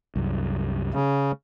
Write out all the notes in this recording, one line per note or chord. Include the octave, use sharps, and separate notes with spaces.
C2 F#2
C#3